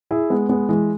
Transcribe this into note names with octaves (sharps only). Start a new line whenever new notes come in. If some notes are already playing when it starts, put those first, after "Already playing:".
E4 G#4
G#3 B3
G#3 B3
E3 G#3